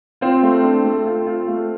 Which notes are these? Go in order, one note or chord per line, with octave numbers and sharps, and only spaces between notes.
C4 F4
A3
D4
A3
F4
F4
A3